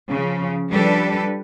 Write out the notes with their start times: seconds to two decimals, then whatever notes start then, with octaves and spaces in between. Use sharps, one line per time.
0.11 C#3 F3
0.70 F3 G3 D4 G4 A4 B4